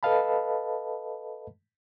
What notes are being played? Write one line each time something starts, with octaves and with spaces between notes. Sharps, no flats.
A4 B4 D#5 F5 A5 B5